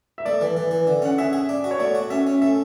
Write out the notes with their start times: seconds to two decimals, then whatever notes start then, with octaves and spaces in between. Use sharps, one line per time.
0.18 E5
0.25 A3 D5
0.41 E3
0.57 E3
0.71 E3
0.87 D3
1.02 C#4 F#5
1.18 G#4 E5
1.33 G#4
1.49 D4
1.64 F#4
1.71 C#5
1.79 A3 D5
1.95 F#4
2.10 C#4 E5
2.27 C#4
2.41 A3 E5